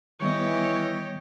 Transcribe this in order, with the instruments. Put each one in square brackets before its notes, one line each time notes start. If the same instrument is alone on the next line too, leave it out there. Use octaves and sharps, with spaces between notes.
[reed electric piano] D#3 G3 B3 [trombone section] E3 [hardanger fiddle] G4 D#5 [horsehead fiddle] C#5